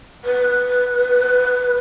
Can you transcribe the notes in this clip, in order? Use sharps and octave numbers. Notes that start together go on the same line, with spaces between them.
B4